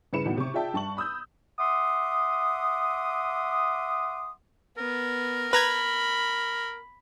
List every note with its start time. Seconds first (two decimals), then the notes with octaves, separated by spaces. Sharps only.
0.13 G2 C#3 E4 B4 C#7 E7
0.25 D#2 A2 D#3 F#3 B3
0.38 C3 C#6
0.54 F4 G#4 D5 E5 G5 A5
0.74 G2 A5 C#6 F#7
0.97 B5 D#6 E6 G6
1.58 E5 F#5 C6 D6 D#6
4.78 B3 A#4
5.53 B4 A#5 B5 G#6